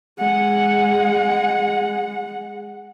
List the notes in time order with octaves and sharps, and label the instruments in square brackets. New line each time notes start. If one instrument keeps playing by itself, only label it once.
[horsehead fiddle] G#3 F#5